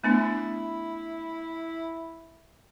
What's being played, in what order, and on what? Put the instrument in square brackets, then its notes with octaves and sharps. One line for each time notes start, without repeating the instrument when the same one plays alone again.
[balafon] A3 B3 D4 [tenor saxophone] E4